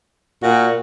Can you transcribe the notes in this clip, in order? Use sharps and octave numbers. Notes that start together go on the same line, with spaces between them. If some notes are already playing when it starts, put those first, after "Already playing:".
A#2 F#4